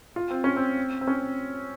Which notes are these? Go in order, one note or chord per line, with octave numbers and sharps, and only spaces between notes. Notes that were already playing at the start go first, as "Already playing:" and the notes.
F4
C4
C#4
C4
C4
C#4